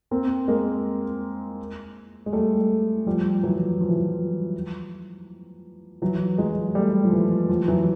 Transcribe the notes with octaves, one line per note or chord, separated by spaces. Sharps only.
A#3 C4
G#3 A#3
G#3
G3 A3
F3 G3
E3 F#3
F3
E3
F3
E3 F#3
F#3 G#3
G3 A3
F3
E3
F3
E3 F#3